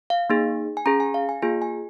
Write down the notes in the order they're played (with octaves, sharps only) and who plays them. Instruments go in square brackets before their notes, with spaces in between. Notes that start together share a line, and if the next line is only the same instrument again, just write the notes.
[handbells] F5
A#3 D#4 G#4
G#5
C#4 G#4 A#5
G#5
F5
G#5
A#3 F4 G#4 G#5
G#5